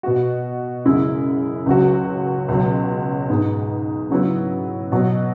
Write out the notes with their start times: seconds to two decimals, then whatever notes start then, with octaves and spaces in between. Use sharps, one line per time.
0.03 B2 B3 F#4
0.85 F#2 C#3 G#3 E4
1.66 C#2 C#3 F#3 C#4 F#4
2.48 C#2 B2 F#3
3.29 G#2 G#3 B3
4.10 C#3 F#3 B3 E4
4.92 B2 F#3 B3